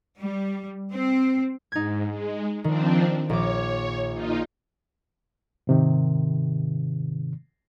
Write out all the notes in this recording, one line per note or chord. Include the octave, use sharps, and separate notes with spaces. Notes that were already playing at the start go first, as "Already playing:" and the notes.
G3
C4
G#2 D#4 G#6
G#3
D#3 F3 C4 D4
A#1 C#5 D6
A#2 D#4 F4
G#2 C3 D#3